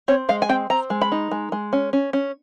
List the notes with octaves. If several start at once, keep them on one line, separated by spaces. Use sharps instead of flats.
C4 C#5
G#3 F5
G#5
C4 G5
C4 A#5
G#3
B5
D#4
G#3
G#3
C#4
C#4
C#4